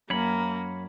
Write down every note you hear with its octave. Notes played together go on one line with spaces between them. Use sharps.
F#2 A#3 C#5 B5